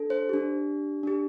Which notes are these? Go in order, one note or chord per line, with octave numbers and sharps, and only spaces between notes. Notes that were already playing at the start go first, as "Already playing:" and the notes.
Already playing: D4 A4
C5
D4 G4
D4 G4